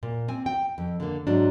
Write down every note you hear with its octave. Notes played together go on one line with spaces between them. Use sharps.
A#2
C4 G#5
G5
F2
D3 A#3
G#2 F#3 D4